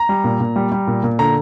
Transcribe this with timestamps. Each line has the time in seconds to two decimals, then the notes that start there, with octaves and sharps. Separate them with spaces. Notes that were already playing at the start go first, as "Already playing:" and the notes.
Already playing: A#5
0.09 G3
0.24 A#2
0.40 A#2
0.56 G3
0.72 G3
0.87 A#2
1.03 A#2
1.19 D3 A#5